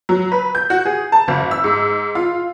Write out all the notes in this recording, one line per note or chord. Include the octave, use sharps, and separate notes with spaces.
F#3
B4
G6
F#4
G#4
A5
F#1
E6
G#2
F4